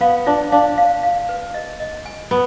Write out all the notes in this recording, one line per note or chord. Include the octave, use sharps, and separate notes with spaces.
B3 F5
D4 F4
D4 F5
F5
F5
B4
D#5
D#5
G#5
B3 G#5